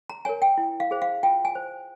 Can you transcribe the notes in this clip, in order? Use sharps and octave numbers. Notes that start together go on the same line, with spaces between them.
A#5
A#4 C#5 G#5
G5
E4
F5
G#4 C5
F5
F4 G5
G#5
C5